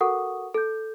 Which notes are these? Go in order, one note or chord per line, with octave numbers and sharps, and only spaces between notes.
F#4 A4 A#4 F#5 C#6 D#6
A4 G6